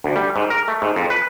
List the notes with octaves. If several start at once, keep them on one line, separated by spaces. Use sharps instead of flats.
D2
G3
G#2
A#4
A3
G#2
F2
B4